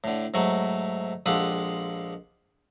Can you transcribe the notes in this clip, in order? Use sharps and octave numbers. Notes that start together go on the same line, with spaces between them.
A2 D3
G#2 F#3 A3 C#6
A#1 G#3 F4 G4 A4 F#5